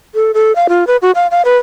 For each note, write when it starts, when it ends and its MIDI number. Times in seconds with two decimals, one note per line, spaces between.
0.15 0.31 69
0.34 0.55 69
0.55 0.67 77
0.69 0.86 65
0.87 0.97 71
1.02 1.11 66
1.15 1.27 77
1.31 1.42 77
1.45 1.57 71